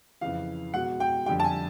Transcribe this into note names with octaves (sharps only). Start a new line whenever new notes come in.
F2 C#3 E3 F5
B2 G#3 F#5
G5
F2 D3 G3 G5
A5
G#5